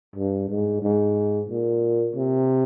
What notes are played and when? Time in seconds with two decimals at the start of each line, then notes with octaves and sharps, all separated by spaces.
0.16 G2
0.49 G#2
0.82 G#2
1.49 A#2
2.16 C3